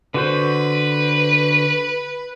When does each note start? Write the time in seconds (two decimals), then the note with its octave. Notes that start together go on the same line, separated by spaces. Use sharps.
0.14 D3 F#4 B4 C5